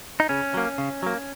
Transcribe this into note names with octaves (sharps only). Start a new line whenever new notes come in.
D#4
C#3 C#4
F#3 A#3
C#3
F#3 A#3